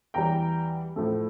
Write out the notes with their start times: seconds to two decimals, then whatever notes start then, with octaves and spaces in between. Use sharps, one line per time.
0.14 E2 E3 G3 G5 A#5
0.96 A2 F3 A3